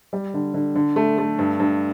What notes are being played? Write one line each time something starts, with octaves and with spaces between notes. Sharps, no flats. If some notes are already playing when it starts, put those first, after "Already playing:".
G3
D3
D3
D3
A3
A3
G2
G2